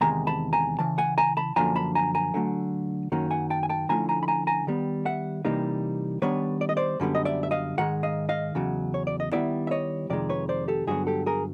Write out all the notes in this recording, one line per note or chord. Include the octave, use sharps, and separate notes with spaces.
E2 C3 D#3 G#3 G#5 A#5
A5 B5
G#5 A#5
C#3 E3 A5
F#5 G#5
G#5 A#5
A5 B5
F#2 D3 F3 A#3 D4 G#5 A#5
A5 B5
G#5 A#5
G#5 A#5
D3 F#3 A3
F#2 D#3 F#3 A#3 C#4
F#5 G#5
G5 A5
G#5
G5 A5
D3 F3 A3 C#4 E4 G#5 A#5
G#5 A#5
B5
G#5 A#5
G#5 A#5
D#3 G3 B3
E5 F#5
C3 E3 G3 A#3 D#4
D#3 G3 B3 D4 B4 C#5
D5
D#5
C5 D5
F#2 D3 G3 B3
D#5
D5 E5
E5
D#5 F5
G#2 D#3 G#3 F#5
D#5 F5
D#5 F5
E2 C#3 F#3
C#5
D5
D#5
D#3 G3 B3 E4 D5 E5
E5
C#5 D#5
F2 C3 D#3 G#3 D5
B4 C#5
C5 D5
G4 A4
G2 D3 F#3 B3 F#4 G#4
G4 A4
G#4 A#4